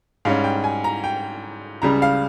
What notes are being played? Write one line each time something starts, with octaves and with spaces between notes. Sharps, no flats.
G#2 G3 C#4 F5
G5
G#5
A#5
G5
C#2 C#3 G3 A#5
F5